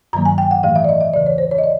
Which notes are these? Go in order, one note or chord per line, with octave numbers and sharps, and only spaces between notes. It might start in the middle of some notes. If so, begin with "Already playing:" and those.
G2 D#3 F#3 A#3 A#5
G#5
G5
F#5
A2 E3 A3 F5
E5
D5
D#5
E5
E2 C#3 E3 D5
C#5
C5
C#5
D#5
D5